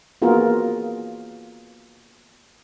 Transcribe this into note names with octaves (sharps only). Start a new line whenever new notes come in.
A#3 B3 F4 F#4 G#4 A#4